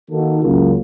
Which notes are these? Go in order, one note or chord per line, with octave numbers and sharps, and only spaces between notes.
D#3 A#3 D#4 F#4 A4
C#2 C#3 F#3 A#3 F4